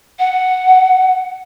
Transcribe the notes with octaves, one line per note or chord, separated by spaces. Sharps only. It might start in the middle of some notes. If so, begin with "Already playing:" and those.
F#5